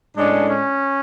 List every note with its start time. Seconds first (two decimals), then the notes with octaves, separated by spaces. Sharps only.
0.17 A2 G#3 C#4 D4
0.50 C#4